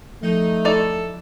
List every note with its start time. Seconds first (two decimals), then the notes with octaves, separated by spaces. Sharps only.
0.23 F3 A3 D#4
0.65 D#4 E4 A4 D5